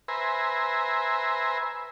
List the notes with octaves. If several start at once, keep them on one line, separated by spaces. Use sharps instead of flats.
B4 C5 E5 G#5 A#5